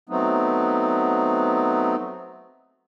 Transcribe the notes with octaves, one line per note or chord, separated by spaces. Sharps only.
F#3 A3 B3 C4 D#4